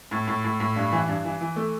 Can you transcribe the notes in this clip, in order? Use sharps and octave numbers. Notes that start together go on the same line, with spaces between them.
A2
A2
A2
A2
G2
E3
G2
E3
E3
A3